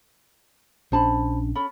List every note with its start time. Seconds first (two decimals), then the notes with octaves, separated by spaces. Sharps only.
0.92 A#1 C#4 D4 C5 A5 B5
1.55 C#4 A4 B5